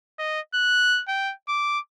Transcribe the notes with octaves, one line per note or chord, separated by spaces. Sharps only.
D#5
F#6
G5
D6